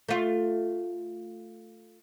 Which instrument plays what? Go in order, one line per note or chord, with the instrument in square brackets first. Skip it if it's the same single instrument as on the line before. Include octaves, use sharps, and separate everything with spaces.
[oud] A3 F4